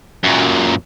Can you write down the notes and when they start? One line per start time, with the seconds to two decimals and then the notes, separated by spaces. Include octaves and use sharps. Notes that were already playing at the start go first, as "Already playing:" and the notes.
0.23 F#2 A#2